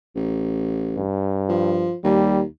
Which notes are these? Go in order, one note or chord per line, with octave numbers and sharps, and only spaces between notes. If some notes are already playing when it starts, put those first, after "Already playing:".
A1
G2
F3
D#2 G3